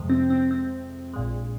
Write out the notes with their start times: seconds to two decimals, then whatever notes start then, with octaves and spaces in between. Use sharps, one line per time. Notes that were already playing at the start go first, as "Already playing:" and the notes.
Already playing: F2 C3 F3 G#3
0.10 C4
0.30 C4
0.51 C4
1.13 A#1 A#2 G#3